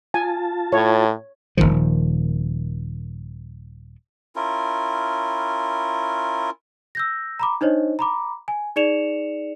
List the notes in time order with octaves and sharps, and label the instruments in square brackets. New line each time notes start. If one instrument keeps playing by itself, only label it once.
[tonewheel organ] F4 A5 [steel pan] G#5
[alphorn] A2 [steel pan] C#5
[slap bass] D#1 C#2 D#3 F3
[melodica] C#4 E4 F4 A#4
[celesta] E6 G6 A#6
A#5 B5 D6
D4 D#4 C5 C#5 D#5
A#5 B5 D6
G#5
D#4 G#4 D5 C#7 E7 F7